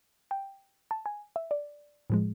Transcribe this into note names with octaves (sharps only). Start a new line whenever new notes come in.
G5
A5
G#5
E5
D5
A2 F3 G#3